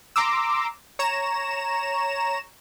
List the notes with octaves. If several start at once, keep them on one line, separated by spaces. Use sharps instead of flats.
A#5 C6 D6 E6
C#5 A#5 E7